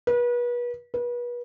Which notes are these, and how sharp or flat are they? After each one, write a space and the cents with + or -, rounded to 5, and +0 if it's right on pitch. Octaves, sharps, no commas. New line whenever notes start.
B4 -35
B4 -35